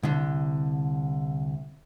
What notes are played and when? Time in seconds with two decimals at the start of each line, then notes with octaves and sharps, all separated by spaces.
0.03 C2 D3